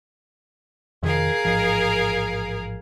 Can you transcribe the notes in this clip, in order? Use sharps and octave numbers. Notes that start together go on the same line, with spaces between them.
F2 C3 D#3 G#4 A#4 F5
A1 G#2 F3